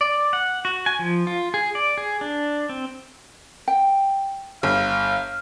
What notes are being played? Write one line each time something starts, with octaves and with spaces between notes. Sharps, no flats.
D5
F#5
F#4
G#5
F3
F4
G#4
D5
G#4
D4
C4
G5
G1 F5